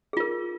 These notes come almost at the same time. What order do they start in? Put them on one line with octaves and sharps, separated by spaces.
G#4 F4 A#4